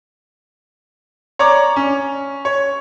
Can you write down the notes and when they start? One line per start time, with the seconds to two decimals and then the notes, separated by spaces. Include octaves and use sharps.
1.39 C#5 D5 A#5 D6
1.76 C#4
2.45 C#5